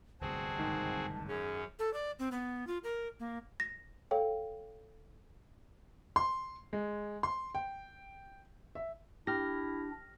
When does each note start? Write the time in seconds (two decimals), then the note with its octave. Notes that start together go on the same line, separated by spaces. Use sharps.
0.21 D1 G1 C2 C4 F#4 G#4 A5
0.59 G#2 D#3
1.28 F#2 C#4 G#4
1.79 A4
1.94 D5
2.19 C4
2.32 B3
2.67 F4
2.84 A#4
3.20 A#3
3.60 A#6
4.11 A4 C#5 F5 G5
6.16 C6
6.73 G#3
7.23 C6
7.55 G5
8.75 E5
9.27 D4 E4 G4 F6 A#6